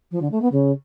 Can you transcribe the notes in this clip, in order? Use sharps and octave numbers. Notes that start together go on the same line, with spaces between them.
F3
D3
A3
B3
C#3